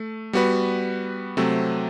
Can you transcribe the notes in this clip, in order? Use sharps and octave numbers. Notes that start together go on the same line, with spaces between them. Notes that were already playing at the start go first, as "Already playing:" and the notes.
Already playing: A3
G3 B3 F#4 B4
C3 F#3 A3 C4